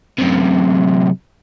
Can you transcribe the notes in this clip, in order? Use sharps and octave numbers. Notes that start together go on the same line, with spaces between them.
F#2 C3